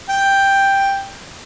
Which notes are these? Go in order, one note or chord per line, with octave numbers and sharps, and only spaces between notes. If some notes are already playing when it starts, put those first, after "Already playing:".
G5